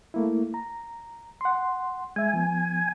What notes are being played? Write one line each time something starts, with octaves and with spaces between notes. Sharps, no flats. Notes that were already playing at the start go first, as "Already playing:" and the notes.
A3 A#3 E4
A#5
F#5 C6
G#3 E5 G#5
F3 B3